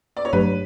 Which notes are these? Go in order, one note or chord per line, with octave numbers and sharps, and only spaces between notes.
D5
C#5
G2 F#3 A3 D4 G4 B4